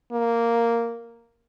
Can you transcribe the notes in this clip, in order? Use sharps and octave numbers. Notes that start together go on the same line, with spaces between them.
A#3